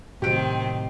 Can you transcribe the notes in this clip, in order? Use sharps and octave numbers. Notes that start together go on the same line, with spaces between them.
A2 C3 D#3 F#3 C4 G4 D7